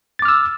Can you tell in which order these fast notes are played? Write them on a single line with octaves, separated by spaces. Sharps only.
A6 D6 F6 E6